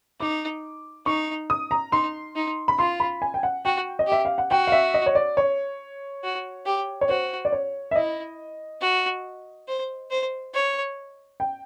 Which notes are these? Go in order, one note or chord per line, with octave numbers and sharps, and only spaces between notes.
D#4 D6
D#4 C#6
D#6
A#5
D#4 C6
D#4
B5
F4 C6
B5
G#5
G5
F#5
F#4 G5
D#5
G4 E5
F5
F#5
F#4 G5
F5
E5
D#5
C#5
D5
C#5
F#4
G4
C#5
F#4 C5
D5
C#5
E5
E4 D#5
F#4
C5
C5
C#5
G5